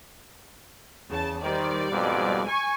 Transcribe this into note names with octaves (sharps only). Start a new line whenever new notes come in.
E2 C#3 A5
D#3 G3 C5 D5
F2 G#2 B2
G#5 C#6